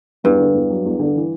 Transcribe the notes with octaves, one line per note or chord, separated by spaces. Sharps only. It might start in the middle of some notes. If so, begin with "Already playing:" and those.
E2 G2
D3
E2
F#3
E2
D3
E3